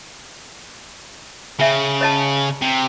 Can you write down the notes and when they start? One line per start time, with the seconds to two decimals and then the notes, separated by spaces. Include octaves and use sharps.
1.59 C#3 C#4 E5
2.01 C#5 D#5 A5
2.62 C3